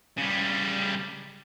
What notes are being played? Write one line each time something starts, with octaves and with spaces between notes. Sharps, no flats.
C#3 G3